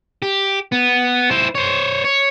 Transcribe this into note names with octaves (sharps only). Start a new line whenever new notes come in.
G4
B3
E4 C5
C5 C#5
C#5